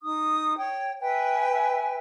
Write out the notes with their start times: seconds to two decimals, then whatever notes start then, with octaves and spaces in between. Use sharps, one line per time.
0.02 D#4 D#6
0.57 C#5 G5
1.01 B4 E5 G5 G#5